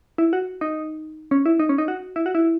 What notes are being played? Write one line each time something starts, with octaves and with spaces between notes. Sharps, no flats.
E4
F#4
D#4
C#4
E4
D#4
C#4
D#4
F#4
E4
F#4
E4